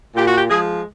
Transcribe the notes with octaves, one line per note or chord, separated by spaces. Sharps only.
A#2 G4
F#4
G4
F3 G#3 G#4